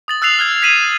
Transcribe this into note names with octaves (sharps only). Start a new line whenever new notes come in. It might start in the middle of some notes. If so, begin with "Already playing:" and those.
D#6 A6 F#7
E6 F#6 A6 C7 F7
F6 F#6 G#6 A6
G#6 B6 C7 D#7 E7 F#7